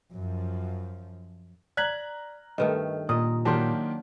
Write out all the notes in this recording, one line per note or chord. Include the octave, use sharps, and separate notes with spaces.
F#2 F3
D5 A#5 F#6 G#6 B6 F#7
G2 D#3 A3 A4 B4 D#5
A#2 A#4 D#5 D#6
D#3 F#3 A#3 D4 F4 G4 A5 C6